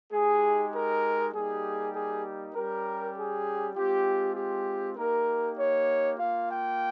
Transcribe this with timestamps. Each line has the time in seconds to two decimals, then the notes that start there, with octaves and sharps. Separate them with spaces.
0.12 G#3 D#4 G4 G#4
0.74 A#4
1.33 G3 A#3 D#4 G4 G#4
1.95 G#4
2.55 G3 C#4 G4 A#4
3.15 G#4
3.75 G#3 C4 F4 G4
4.36 G4
4.97 A#3 D#4 G4 A#4
5.57 C#5
6.17 F4 F5
6.23 A#3
6.49 G5